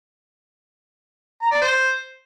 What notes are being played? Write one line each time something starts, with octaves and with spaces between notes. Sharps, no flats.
A#5
D5
C5